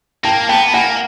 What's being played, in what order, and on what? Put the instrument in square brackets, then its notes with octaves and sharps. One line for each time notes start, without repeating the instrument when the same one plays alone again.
[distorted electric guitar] A#3 [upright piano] G5 A5
[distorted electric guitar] B3 [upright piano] G5 A5
[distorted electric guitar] A#3 [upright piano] F#5 G#5